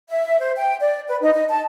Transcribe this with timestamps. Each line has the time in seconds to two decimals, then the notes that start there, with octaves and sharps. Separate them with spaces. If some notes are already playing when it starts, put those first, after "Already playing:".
0.10 E5
0.39 C5
0.57 G5
0.81 D5
1.08 B4
1.21 D#4
1.34 D#5
1.50 A5